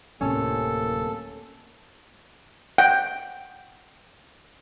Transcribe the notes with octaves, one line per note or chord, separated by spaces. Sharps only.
D1 A2 C3 A#3 C#4 A4
F#5 G5